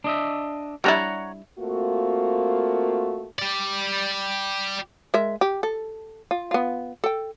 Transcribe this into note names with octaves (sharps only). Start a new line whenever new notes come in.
D4 D#5 E5
G3 D4 E4 C#5 F#5 A#5
A3 A#3 C4 F4 F#4
G4 D5
G#3 A#4 E5
G4
A4
F4
B3 F4
A4 G5